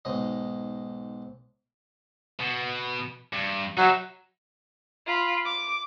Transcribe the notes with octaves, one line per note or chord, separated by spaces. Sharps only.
B1 G#2 D#5
B2
G2
F#3 D#4 E4
F4 B5
D6